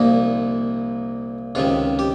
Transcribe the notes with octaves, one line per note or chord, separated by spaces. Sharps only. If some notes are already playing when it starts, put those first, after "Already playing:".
Already playing: C2 A#2 F3 A#3 D#4
C#2 C3 D#3 F4
G4